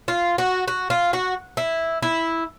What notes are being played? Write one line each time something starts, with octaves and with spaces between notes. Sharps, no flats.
F4
F#4
F#4
F4
F#4
E4
E4